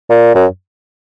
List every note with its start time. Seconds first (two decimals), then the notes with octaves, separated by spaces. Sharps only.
0.10 A#2
0.35 F#2